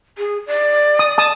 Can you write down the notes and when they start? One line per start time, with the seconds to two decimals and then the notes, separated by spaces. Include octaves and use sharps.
0.18 G#4
0.47 D5
0.99 D#6
1.18 A5 D#6